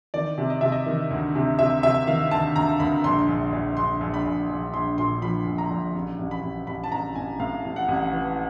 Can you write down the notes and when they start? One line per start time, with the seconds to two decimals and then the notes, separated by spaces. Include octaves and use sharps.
0.14 D#3 D5
0.38 C3
0.50 D#5
0.61 C3 E5
0.72 D#5
0.86 D#3
1.11 D2
1.35 C3
1.59 C3 E5
1.83 C3 E5
2.07 D#3 F5
2.31 D2 A5
2.56 D2 A#5
2.80 D2 B5
3.04 A#1 C6
3.28 A#1
3.53 A#1
3.77 A#1 C6
4.01 A#1
4.14 B5
4.25 A#1
4.49 A#1
4.73 A#1 C6
4.98 A#2 C6
5.22 F3 B5
5.46 A#1
5.58 A#5
5.71 A#1
5.95 A1
6.19 A1
6.31 B5
6.43 A1
6.67 A1 B5
6.84 A5
6.92 A1 A#5
7.15 A1 G#5
7.40 A2 F5
7.64 A1
7.76 F#5
7.88 A1
8.13 E3